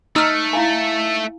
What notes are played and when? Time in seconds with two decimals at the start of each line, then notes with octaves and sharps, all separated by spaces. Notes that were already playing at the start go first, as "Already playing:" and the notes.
0.16 A3 D#4 E6 F6
0.53 E4 F5 G#5